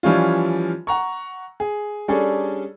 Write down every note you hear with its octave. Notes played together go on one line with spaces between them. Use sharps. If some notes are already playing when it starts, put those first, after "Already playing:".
E3 F3 G3 C#4 F4
F#5 A#5 C#6
G#4
G3 C#4 D4 G#4 A4